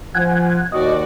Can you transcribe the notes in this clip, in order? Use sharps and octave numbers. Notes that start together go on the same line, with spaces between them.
F3 F#5 G#5
D#2 F#4 D5 D#5